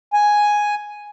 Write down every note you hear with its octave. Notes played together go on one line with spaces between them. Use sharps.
G#5